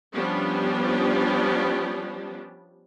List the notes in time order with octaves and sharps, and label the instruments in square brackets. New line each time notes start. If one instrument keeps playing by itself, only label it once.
[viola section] F3 G3 B3 C#4 D4 G4